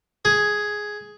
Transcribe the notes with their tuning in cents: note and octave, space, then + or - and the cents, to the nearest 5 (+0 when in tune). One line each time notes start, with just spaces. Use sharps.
G#4 +5